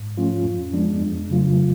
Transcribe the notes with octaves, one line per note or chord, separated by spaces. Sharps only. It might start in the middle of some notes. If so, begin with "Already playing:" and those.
Already playing: G#2
F3 A3 C#4 F4
F2
F3 G#3 B3 D4
F2
C#3 F#3 A3 F4